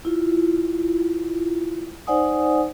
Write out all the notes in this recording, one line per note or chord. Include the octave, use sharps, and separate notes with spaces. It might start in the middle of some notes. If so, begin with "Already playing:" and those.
E4 F4
D#4 C5 D5 F#5 G#5 D#6